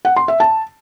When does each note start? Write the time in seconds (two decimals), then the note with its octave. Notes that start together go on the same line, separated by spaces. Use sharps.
0.05 F#5
0.16 C6
0.28 E5
0.40 A5